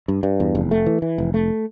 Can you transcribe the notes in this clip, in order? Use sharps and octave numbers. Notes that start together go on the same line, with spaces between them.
G2
G2
E2
F1
A3
E3
E3
F1
A3